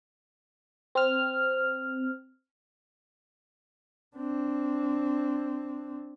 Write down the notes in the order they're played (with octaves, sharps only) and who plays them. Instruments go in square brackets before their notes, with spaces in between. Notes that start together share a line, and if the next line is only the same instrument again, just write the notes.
[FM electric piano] C4 F6
[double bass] C4 D4